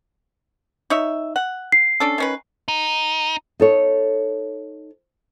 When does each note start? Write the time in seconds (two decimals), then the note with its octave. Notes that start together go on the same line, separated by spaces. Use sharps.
0.90 D#4 C#5 E5
1.36 F#5
1.72 C7
2.00 C#4 D4 A4
2.18 D#3 C#4 B4
2.68 D#4
3.60 D#4 A4 C#5